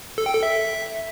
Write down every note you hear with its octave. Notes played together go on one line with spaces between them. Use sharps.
A4
G5
A4
E5